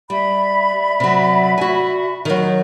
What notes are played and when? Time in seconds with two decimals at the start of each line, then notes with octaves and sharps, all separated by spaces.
0.10 G3 D5 E5 B5
1.00 C3 F#3
1.58 F#4 G#5
2.25 D#3 F#3